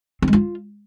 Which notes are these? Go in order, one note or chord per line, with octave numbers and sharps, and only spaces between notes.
C4
G#3
F4